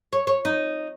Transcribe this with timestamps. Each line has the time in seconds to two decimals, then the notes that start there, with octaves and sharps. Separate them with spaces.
0.13 C#5
0.27 C#5
0.45 D#4